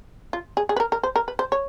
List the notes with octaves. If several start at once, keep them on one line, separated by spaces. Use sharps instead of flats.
F4
G#4
G#4
B4
A#4
A#4
C5
A#4
B4
C5
C#5